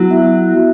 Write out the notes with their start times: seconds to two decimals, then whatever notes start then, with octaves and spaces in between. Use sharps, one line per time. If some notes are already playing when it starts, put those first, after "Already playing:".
Already playing: F#3 B3 E4
0.11 E5